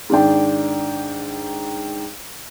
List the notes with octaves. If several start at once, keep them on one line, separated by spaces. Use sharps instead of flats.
G#2 D#3 D4 G5